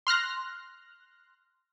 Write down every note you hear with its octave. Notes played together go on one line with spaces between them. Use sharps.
C6 F6 F#6 A#6